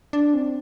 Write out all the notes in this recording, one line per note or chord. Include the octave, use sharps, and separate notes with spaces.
D4
C4